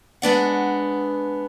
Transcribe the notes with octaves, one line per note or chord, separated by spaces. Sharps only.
G#3 B3 D4 F#5